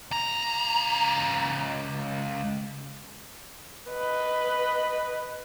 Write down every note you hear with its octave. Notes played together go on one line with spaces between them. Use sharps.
C#2 A#5
B4 D#5